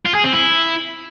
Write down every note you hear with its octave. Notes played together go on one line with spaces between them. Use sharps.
F4
G#4
C4
E4